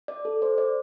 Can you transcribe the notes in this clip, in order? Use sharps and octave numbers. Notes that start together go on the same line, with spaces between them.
D5
A4
C5
D5